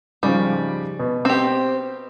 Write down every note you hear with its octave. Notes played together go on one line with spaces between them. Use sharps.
G#2 C#3 F3 G3
B2
C4 G4